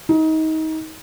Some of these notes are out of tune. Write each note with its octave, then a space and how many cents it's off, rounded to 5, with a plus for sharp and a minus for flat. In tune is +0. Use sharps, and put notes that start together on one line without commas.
D#4 +25